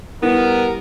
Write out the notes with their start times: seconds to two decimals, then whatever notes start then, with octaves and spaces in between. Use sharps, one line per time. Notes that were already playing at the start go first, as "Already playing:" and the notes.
0.23 G3 B3 E4 A#4